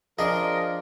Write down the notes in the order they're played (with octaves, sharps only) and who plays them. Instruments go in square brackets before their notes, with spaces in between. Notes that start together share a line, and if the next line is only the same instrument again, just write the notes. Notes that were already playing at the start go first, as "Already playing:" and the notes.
[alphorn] F3 [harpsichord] D4 G#4 [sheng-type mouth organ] A#4 [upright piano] D#5